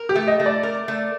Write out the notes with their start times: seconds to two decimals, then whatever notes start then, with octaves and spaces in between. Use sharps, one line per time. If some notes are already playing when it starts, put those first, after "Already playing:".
Already playing: A#4
0.09 G4
0.15 A3
0.28 D#5
0.40 A3
0.46 D5
0.63 A#4
0.88 A3